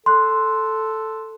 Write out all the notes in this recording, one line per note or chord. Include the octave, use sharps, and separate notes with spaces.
A4 C6 F#6